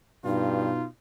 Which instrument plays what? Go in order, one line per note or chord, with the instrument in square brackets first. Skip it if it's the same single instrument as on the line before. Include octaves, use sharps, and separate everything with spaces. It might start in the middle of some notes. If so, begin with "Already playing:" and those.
[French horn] G2 [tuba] B2 [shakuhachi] D#4 [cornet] F4